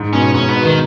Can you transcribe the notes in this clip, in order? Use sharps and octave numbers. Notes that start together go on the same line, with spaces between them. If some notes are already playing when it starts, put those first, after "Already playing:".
Already playing: G#2
B2 C#4
G#2 C#4
B3
B2
D#3